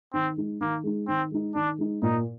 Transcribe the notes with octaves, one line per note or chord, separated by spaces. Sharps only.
D#3 C4
G#3 D#4
D#3 A#3
G#3 D#4
D#3 C4
G#3 D#4
D#3 D4
G#3 D#4
A#2 D#4